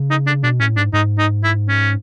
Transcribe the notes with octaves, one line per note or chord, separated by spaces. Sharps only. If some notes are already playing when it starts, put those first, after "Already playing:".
Already playing: C#3
D#4
D4
B2 D4
A2 C#4
G#2 D4
G#2 D#4
D#4
E4
C#4